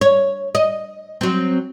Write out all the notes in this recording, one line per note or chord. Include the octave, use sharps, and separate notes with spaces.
C#5
D#5
F#3 C4